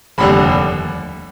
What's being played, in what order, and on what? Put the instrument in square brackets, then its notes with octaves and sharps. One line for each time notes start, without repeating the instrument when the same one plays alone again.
[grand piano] F1 D#2 D3 G3 B5